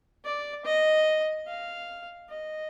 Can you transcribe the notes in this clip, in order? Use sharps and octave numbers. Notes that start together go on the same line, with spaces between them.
D5
D#5
F5
D#5